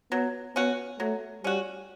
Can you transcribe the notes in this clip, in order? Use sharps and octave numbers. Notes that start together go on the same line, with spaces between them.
F#3 B3
B3 C#4 F#4
F#3 A3
G3 C#4 F#4